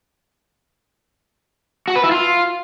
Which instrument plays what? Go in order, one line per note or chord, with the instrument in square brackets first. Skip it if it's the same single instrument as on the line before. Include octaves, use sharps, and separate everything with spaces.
[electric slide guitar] F#4
B4
E4
F4